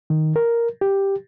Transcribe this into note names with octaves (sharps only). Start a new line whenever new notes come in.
D#3
A#4
G4